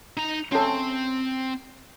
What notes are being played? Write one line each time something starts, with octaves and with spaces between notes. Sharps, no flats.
D#4 A#5
C4 C#4 A4